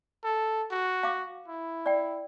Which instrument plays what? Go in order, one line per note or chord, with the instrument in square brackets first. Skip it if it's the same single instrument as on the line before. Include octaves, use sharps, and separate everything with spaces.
[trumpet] A4
F#4
[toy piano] F5 D6
[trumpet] E4
[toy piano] D5 G5